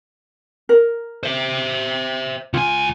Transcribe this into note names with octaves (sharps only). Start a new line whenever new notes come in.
A#4
C5 E5
C#2 F4 G#5